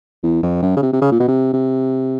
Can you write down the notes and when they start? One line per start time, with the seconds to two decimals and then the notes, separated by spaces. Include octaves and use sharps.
0.23 E2
0.43 F2
0.62 F#2
0.77 C#3
0.82 C3
0.93 C3
1.02 C#3
1.12 A#2
1.20 B2
1.28 C3
1.53 C3